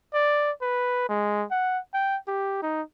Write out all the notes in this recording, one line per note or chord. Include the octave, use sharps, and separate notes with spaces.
D5
B4
G#3
F#5
G5
G4
D#4